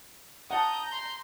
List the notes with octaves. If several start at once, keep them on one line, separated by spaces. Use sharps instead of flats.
F#5 A5 A#5 D#6 G6
C6